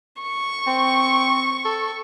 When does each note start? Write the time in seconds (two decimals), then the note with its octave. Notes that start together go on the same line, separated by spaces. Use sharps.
0.22 C#6
0.67 C4
1.65 A4